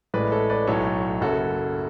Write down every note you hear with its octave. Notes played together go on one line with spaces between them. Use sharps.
A1 A2 G#3 B4 D5
A4 C#5
B4 D5
B1 A2 F#3 A4 C#5
F#1 F#2 C#3 F#4 A4